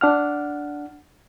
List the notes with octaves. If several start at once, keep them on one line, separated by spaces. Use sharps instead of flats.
D4 F#5 F6